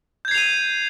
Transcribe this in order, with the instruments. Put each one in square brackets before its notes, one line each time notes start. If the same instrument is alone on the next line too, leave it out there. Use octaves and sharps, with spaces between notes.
[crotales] G6
G#6
C7
F7
D#7